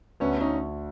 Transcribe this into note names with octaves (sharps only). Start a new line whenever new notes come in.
D2 B3 C#4
C#4 D#4